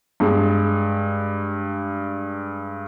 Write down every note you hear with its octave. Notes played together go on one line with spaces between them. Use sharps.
G2 G#3